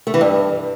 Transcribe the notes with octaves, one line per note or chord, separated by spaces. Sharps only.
A3
E3
G2